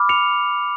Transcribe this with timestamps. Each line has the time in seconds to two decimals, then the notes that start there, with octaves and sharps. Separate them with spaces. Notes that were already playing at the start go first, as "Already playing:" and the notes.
Already playing: B5 D6 F6
0.09 C#7 F7